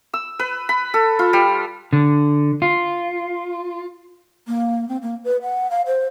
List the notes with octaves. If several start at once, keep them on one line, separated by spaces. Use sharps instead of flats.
E6
B4
B5
A4
F4
G3
D3
F4
A#3
C4
A#3
B4
F#5
F5
C5